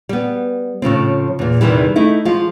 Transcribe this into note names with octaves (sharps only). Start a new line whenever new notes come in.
G3 B3
A2 C#3 F3 C4
E2 A#2
E2 C3 D#3 E3 G3
A3 D#4 E4
F3 G#3 F4